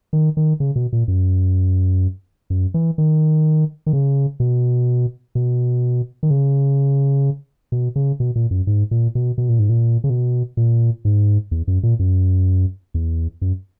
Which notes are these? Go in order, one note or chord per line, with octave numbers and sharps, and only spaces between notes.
D#3
D#3
C#3
B2
A#2
F#2
F#2
E3
D#3
D#3
C#3
B2
B2
D#3
C#3
B2
C#3
B2
A#2
F#2
G#2
A#2
B2
B2
A#2
G#2
A#2
C#3
B2
A#2
G#2
E2
F#2
A#2
F#2
E2
F#2